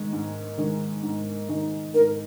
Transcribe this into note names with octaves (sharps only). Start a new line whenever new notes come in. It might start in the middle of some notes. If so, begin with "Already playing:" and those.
Already playing: G#2 D#3 G#3 D#4
G#2
D#3 G#3 D#4
G#2
D#3 G#3 D#4
G#2 A#4